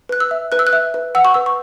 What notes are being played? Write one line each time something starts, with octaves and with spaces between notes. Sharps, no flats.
B4 F#6
E6
E5
B4 F#6
E6
F#6
E5
B4
F#5 E6
C#6
B4 E6
C#6